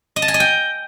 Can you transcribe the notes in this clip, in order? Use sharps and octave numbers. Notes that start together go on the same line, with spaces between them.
D#5
A5
G#5
D#5
G5